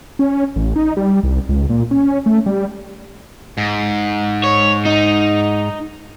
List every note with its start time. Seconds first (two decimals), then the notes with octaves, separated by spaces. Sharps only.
0.19 C#4
0.56 A1
0.76 D#4
0.97 G3
1.23 C2
1.49 C#2
1.69 A#2
1.91 C#4
2.26 A3
2.46 G3
3.58 G#2
4.44 C#5
4.86 D#4